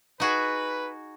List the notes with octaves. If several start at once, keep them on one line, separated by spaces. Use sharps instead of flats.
D#4 F#4 G#4 B4